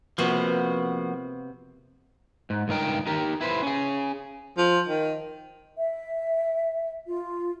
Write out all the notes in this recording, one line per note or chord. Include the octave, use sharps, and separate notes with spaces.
C3 F3 A#3 B3 F4 F#4
G#2
C#2 G2 D#4 A#4 G5
D#4 G4 A#4
E4 B4 C5
C#4 G#4
F3
D#3
E5
F4